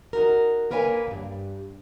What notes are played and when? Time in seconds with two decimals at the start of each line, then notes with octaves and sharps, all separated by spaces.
0.13 D#4 F#4 A#4
0.71 A#3 A#4 B4 C#5 G5 G#5
1.07 D2 G2